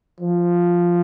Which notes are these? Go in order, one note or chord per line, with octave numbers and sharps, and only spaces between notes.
F3